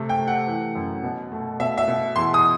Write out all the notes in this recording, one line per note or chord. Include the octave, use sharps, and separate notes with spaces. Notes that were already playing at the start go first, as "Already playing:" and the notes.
Already playing: C3 A3
G5
A3
F#5
E3
F#2
B2
A3
B2 E5
E5
B2
E2 C6
D#6